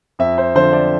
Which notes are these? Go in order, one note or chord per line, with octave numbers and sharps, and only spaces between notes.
F2 E5
C5
D3 F3 C5
D5